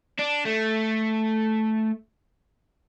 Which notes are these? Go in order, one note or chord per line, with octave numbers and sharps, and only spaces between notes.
D4
A3